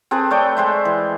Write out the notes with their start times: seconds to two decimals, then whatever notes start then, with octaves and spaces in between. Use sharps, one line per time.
0.11 C4 G#4 A4 B4
0.31 A3 C#5 D5 G5
0.57 G#3 C5 E5
0.85 E3